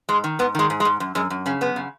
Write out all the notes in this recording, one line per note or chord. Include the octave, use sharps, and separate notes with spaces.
G#2 G#3
D#3
G#2 B3
D#3 G#3
G#2
G#3
G#2
F#2
F#2 G#3
F#2
C#3 C#4
F#2 B3
C#3